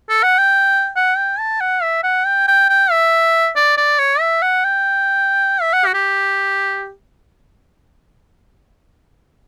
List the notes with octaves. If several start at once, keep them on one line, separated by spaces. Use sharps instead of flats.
A4
F#5
G5
F#5
G5
A5
F#5
E5
F#5
G5
G5
G5
E5
D5
D5
C#5
E5
F#5
G5
E5
F#5
F#4
G4